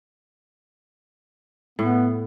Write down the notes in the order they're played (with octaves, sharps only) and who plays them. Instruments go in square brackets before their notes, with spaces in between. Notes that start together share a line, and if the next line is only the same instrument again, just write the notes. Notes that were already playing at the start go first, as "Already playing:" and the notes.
[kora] A2 [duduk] B3